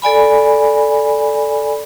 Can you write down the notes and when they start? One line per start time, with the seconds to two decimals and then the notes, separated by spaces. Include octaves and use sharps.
0.02 A4 D5 G#5 B5